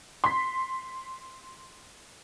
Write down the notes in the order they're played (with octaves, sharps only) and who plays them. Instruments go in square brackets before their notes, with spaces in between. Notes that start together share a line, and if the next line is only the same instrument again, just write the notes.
[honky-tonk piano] C6 B6